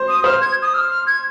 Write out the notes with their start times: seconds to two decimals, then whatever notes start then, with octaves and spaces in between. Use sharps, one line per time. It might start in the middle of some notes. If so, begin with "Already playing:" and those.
Already playing: C5
0.08 D#6
0.24 C5 F6
0.41 G#6
0.62 D#6
0.74 F6
0.90 F6
1.06 G#6